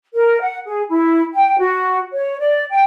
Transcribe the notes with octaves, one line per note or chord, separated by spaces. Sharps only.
A#4
F#5
G#4
E4
G5
F#4
C#5
D5
G5